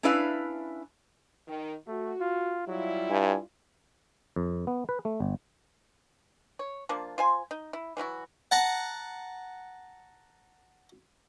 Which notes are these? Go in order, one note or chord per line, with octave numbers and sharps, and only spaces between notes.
C#4 D4 E4 B4 E5 F5
D#3
A3 F#4
F4
F#3 G3 E4 F4
G2 G#5
F2
B3
B4
A3
G1
C#5
F3 A#3 D4 F4
F4 C5 G#5
D#4
E4
E3 F#3 E4 F#4
F#5 A5 A#5